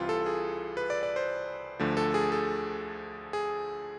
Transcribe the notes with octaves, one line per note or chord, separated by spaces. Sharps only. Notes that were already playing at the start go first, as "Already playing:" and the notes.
Already playing: C2 C3 E3 F4
A4
G#4
B4
D5
D5
C5
D2 D3 F3 A3
A4
G#4
A4
G#4